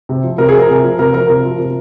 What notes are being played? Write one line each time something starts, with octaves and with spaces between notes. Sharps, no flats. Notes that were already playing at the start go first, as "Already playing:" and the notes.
C3
F3
C3 A#4
G#4
F3 A#4
C3
F3
C3 A#4
F3 A#4
C3
F3
C3